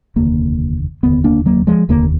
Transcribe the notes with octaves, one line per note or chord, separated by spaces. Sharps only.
F1 D#2 D3 A#3
F1 D#2 D3 B3
A#3 D4
F#3 A#3
F3 G#3
F1 D#2 D3 A#3